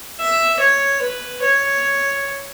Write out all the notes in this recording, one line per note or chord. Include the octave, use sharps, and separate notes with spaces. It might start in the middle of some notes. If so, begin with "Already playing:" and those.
E5
C#5
B4
C#5